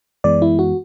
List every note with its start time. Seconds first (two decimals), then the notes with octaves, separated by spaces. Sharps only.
0.24 F#2 E3 G#3 B3 D5
0.42 E4
0.59 F#4